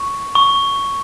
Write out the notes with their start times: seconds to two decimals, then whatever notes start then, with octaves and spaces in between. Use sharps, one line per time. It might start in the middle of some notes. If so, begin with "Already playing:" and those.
Already playing: C#6
0.35 C#6